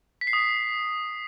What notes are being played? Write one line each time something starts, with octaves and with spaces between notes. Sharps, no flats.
B6
C7
D#6
C7